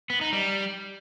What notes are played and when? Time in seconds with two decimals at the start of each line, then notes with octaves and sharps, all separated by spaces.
0.10 B3
0.21 D#4
0.33 G3